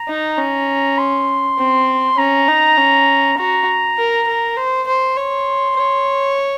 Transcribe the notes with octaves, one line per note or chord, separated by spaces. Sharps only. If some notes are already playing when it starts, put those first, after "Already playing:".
Already playing: A#5
D#4
C#4
C6
C4
C#4 A#5
D#4
C#4
F#4 A#5
A#4
A#4
C5
C5
C#5 C6
C#5